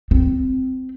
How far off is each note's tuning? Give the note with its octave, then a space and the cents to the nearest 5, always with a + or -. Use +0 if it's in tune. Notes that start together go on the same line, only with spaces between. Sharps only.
C4 -15